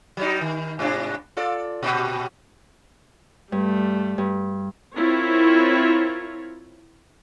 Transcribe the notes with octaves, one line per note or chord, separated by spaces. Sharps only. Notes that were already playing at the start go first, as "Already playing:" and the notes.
F#3 G3 D#4
D#3
G#2 C3 D4
F4 A4 D5
A#2 F#4 G4
G2 G3 A3
G2
C4 E4 F4 A#4 C#5